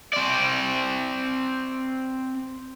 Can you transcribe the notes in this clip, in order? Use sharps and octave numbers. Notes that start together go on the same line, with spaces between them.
C4 D5